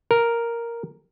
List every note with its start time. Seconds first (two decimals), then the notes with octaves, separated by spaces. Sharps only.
0.11 A#4